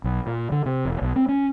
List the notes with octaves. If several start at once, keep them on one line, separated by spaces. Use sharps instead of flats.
B1
A#2
D3
C3
E1
B1
C4
C#4